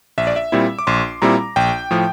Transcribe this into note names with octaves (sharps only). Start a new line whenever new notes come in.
A#1 E5
D5
E5
A#2 G3 C4 E4
D6
A#1 C6
A#2 G3 C4 E4 A#5
A#1 G5
A2 F3